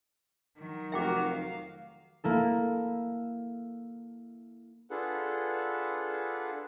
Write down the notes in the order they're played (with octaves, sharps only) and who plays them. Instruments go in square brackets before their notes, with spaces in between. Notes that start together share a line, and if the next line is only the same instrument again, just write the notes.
[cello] D#3 F#3
[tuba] F1 [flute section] F#4 A#4 [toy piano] E5 G5 D6
[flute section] F5
[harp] A#3 E4 A4
[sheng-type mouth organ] D4 F4 G#4 A4 B4 F#5